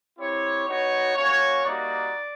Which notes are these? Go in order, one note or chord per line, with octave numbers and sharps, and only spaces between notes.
C4 E4 G4 C#5
B3 D#4 F#4 C#5
A#3 C#4 F#4 C#5
G3 A#3 D#4 F#4 D5